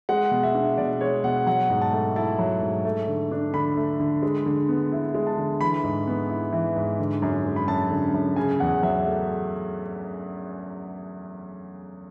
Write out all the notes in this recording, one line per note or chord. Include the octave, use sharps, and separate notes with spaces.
G#3 F#5
B2
E5
D4
B2 D5
G#3 C#5
B2 F#5
F#3 F#5
G#2
A5
A3
E4 A5
F#3
G#2
A3
D3
D4
D3 B5
A3
D3
G#3
D3
B3
E4
G#3
A5
D3
E3 B5
G#2
B3
E4
E3
G#2
D3
F#2
G#3
B5
F#2 A5
D3
F#2
C#3 G#5
E2 F#5
F#3 E5
A3